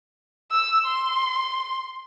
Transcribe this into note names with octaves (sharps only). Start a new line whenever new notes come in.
E6
C6